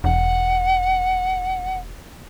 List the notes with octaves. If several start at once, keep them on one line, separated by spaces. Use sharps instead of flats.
E1 F#5